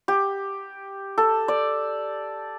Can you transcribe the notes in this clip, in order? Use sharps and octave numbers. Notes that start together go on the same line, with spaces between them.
G4
A4
D5